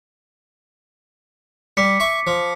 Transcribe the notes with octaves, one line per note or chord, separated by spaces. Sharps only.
G3 D6 B6 C#7
E5 C#6
F3